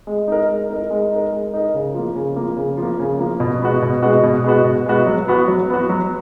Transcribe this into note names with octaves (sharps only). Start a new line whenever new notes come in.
G#3
D#4 A#4
G#3
D#4 A#4
G#3
D#4 A#4
G#3
D#4 A#4
C#3
F3 A#3
C#3
F3 A#3
C#3
F3
A#3
C#3
F3 A#3
B2
G#3 B3 F#4
B2
G#3 B3 F#4
B2
G#3 B3 F#4
B2
G#3 B3 F#4
F#3
B3 F#4
F#3
B3 F#4
F#3